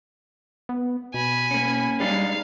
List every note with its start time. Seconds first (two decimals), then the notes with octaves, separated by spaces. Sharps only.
0.69 B3
1.14 B2 G#5 B5
1.51 A#3 C#4
2.00 G3 G#3 D4 D#4 F5